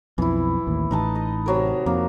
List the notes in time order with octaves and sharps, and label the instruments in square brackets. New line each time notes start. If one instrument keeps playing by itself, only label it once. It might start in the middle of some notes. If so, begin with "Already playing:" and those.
[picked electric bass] B1 F2 [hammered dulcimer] E3 E4
[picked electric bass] A1 D#2
[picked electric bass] A1 [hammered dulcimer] D#4 B4 A5
[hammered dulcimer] D#5
C3 F#3 A#4
[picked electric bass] F2 [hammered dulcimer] A#3